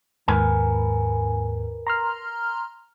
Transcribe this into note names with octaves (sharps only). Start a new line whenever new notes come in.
D#2 G#2 A#4 B4 G#5
A#5 C6 F6